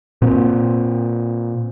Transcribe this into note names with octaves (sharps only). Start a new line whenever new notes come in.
A#2 C4